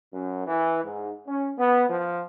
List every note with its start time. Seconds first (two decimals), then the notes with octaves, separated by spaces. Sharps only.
0.13 F#2
0.47 E3
0.84 G#2
1.28 C#4
1.59 B3
1.89 F3